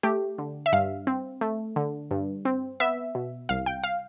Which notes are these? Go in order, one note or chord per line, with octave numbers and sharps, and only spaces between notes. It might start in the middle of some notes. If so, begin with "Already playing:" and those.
A3 G4
D3
E5
G2 F5
C4
A3
D3
G2
C4
B3 E5
B2
C2 F5
G5
F5